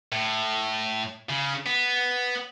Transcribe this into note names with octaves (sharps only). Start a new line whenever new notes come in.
A2
C#3
B3